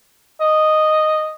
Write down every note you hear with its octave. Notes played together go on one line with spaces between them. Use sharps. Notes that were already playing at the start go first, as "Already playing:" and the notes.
D#5